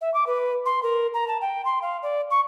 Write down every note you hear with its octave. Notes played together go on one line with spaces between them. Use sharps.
E5
D6
B4
C6
A#4
A#5
A5
G5
C6
F5
D5
C#6